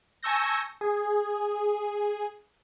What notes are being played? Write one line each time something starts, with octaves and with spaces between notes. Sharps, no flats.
G#5 A5 C#6 E6 G6 A#6
G#4